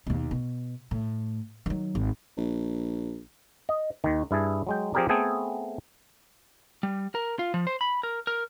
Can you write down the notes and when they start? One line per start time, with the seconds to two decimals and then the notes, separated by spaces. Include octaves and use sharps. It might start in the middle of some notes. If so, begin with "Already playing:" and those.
0.07 D#2 B2
0.31 B2
0.91 A2
1.66 D#3 F#3
1.95 G#1
2.38 A#1
3.69 D#5
4.04 D#2 D#3
4.31 G2 E4 G#4 A5
4.67 F#3 G#3 G5
4.94 F3 C4 G4 G#4 A#4 D5
5.09 A3 B3 C4 G#4 A4 G5
6.83 G3
7.15 A#4
7.39 F4
7.54 F3
7.67 C5
7.81 B5
8.03 A#4
8.27 A#4